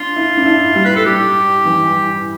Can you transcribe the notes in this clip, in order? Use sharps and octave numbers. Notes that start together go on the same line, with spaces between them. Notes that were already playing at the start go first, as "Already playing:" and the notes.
Already playing: D4 F4
E4
D4
E4
G3
B4
A4
G3 G4
E3